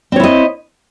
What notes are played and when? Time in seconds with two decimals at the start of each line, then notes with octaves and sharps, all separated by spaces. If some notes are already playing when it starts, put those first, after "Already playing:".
0.12 C4
0.16 C#5
0.20 E4
0.23 D#5